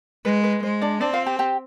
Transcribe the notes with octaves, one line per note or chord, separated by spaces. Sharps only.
G#3 B4
B4
G#3 C5
D4 D5
C4 D4 D5
F4 F5
G4 G5
G4 G5